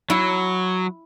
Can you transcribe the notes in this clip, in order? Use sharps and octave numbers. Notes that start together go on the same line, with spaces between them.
F#3 E4